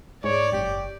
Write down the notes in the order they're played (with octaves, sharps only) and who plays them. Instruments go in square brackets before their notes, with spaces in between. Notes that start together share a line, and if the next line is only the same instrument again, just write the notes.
[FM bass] G#2 [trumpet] C#5 [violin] D5
[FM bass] F#1 [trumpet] G4